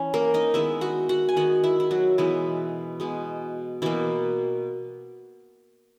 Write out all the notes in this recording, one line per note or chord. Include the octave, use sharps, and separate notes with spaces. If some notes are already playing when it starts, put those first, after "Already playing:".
Already playing: E3 C#4
A#3 A#4
D#4 D#5
D#3 G#3 B3 E4 E5
F#4 F#5
F#4 F#5
G#5
D#3 G#3 B3 F#4 F#5
E4 E5
E4
F#3 F#4
B2 E3 G#3 B3 E4
B2 G#3 B3
B2 E3 A#3 E4